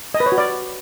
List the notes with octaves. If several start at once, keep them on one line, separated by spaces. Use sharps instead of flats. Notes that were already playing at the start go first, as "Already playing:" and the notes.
D#5
B4
C#5
F#4
D5